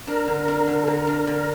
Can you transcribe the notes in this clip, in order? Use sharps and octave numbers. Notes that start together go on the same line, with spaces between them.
D4 A#4
D3
D4
D3
A4
D3 A#4
D4
D3